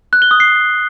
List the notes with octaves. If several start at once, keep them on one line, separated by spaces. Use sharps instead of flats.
F#6
G7
D#6
C7